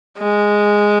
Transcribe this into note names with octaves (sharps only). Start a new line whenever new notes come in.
G#3